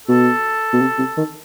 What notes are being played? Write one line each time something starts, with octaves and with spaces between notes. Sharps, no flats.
B2 A4
B2
C3
C3
D#3